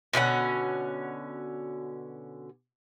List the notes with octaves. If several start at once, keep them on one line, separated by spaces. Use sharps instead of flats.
B2 D3 C#4 F#5